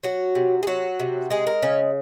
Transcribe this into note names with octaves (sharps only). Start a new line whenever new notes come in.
F#3 F#4
C3
G#4
F#3 F#4
C3
G#3 G#4
A#4
C#3 C#4